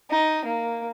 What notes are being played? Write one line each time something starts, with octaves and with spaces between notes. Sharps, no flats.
D#4
A#3